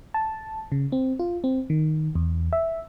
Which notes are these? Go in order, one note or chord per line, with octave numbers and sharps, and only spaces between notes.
A5
C#3
C4
F4
C4
D#3
E2
E5